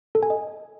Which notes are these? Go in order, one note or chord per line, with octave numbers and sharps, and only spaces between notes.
A4
G#5
D#5